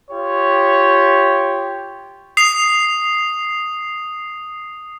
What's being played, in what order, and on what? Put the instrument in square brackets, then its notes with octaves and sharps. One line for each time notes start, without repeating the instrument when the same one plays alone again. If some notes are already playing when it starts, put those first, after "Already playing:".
[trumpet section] F4 G4 C#5
[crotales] D#6 C7 F7